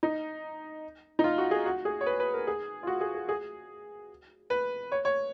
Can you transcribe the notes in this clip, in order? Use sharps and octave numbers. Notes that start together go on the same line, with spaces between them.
D#4
D#4
F4
F#4
G#4
F#4
G#4
C#5
B4
B4
A#4
G#4
F4
F#4
G#4
G#4
G#4
B4
C#5
C#5